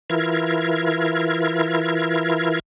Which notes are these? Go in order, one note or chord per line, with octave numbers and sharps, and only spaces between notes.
E3 E4 F4 A#4 G#6